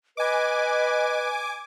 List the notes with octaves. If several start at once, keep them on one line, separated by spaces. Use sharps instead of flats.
B4 D#5 G#5 D6